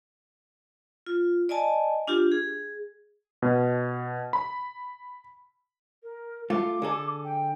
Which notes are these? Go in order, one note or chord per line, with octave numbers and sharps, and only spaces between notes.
F4
D5 D#5 G#5 A5
D4 F4 G4
G#4
B2
B5
A#4
A3 F4 D6
D3 G#4 A4
G5